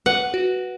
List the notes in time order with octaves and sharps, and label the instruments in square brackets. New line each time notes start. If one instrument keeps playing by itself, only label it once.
[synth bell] B4 [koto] F#5
[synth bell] F#4